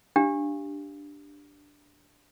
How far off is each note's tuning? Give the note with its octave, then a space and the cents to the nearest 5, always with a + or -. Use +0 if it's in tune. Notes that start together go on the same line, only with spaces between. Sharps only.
D4 +0 G4 +0 F5 +0